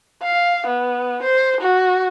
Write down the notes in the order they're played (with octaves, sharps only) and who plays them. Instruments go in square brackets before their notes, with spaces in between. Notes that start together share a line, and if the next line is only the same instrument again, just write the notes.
[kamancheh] F5
B3
C5
F#4